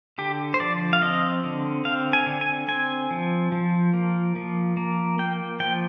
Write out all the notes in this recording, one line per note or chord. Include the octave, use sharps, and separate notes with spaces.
D3 G4
C5
F3 D5
F5
C4 D#5
D3
C4 F5
G#5
D3
G#5
C4 G#5
F3
F3
A#3
F3
A#3
A#3 G5
F3 G5